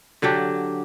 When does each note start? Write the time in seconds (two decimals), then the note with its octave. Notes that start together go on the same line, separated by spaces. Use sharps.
0.22 D3 F#3 D4 G4